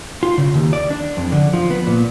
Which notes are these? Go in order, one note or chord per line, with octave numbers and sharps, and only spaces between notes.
F4
C#3
D#2
D5
D4
F2
D3
F3
B3
A#2